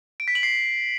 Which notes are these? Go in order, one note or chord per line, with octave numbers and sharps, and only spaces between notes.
D7
B6
F#7
C7